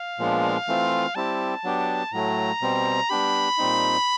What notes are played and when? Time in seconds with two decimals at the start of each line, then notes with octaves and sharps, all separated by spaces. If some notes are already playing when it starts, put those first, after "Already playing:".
Already playing: F5
0.19 A#2 F3 G#3 B3 D4
0.68 E3 A3 C4 F4
1.15 G3 C4 E4 G4 A5
1.64 F#3 B3 D4 G4
2.12 A2 F#3 A3 A#5
2.61 B2 G3 C4
3.10 G3 B3 D4 G4 B5
3.58 A#2 G3 C4 D#4